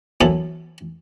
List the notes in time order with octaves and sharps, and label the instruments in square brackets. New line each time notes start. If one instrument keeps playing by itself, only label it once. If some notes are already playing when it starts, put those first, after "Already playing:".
[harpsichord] F#2 E3 F#3 B3 C#4 A4